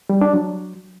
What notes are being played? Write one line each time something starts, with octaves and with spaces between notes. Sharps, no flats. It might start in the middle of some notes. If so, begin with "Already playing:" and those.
G3
D4
F#3